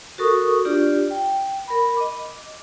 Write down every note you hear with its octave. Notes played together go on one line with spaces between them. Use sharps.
F#4 A4 A#4 C#6 D#6
D4 F4 G4 D5
G5
A#4 B5
D#5 D6